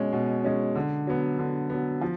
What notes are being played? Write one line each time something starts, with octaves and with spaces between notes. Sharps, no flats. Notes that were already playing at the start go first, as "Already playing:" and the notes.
Already playing: B2 G#3 C#4
B2
G#3 C#4
D3
F#3 B3
D3
F#3 B3
F3